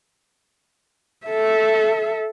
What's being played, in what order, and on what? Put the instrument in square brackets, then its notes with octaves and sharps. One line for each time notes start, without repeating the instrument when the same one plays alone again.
[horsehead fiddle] A4 E5